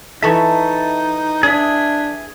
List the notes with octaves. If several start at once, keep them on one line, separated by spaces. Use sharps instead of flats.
E3 D#4 A4 E5 A5 C#6
D4 G#4 E5